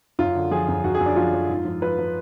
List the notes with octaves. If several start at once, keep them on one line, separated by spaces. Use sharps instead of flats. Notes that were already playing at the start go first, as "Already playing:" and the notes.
F#2 F4
D3
F3 G#4
F#2
F#2 F#4
G#4
F#2
D4
F3 F4
F3
G#2
F3
F3 B4
F3